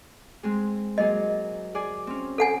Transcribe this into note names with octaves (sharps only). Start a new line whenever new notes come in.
G#3 C4 G#4
F#3 A#3 G#4 D#5
G#4 D5 G#5
C4 C#4
A4 F#5 G#5